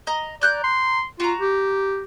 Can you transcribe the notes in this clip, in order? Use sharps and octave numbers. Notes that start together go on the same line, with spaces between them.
D#5 A#5
D5 A#5 F#6 G6
C6
F4 F#4 A#5
G4